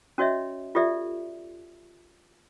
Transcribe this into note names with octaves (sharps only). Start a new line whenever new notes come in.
C#4 F#4 C#5 D#5 E5
F4 G4 A4 D5 E5